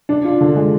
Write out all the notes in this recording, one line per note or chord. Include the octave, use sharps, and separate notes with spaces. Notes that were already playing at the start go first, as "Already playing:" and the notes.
D4
F4
D3
G#3